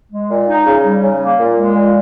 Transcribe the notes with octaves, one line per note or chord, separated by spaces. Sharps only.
G#3
A#2
D#4
C#3
G3
C#3
A#3
A#2
G#3
A#2